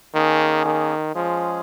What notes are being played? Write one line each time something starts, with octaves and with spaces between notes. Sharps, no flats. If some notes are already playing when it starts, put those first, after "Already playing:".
D#3 A#3 C#4 G#4
D#3
F3 G#3 C#4 G#4